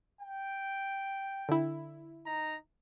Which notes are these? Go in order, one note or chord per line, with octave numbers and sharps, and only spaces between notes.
G5
D3 E4
D#4 A#5